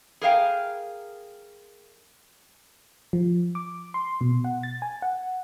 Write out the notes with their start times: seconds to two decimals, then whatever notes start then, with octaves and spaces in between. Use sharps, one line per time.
0.21 G#4 A#4 F5 G5
3.13 F3
3.55 D6
3.94 C6
4.21 B2
4.44 F#5
4.63 A6
4.82 G#5
5.02 F#5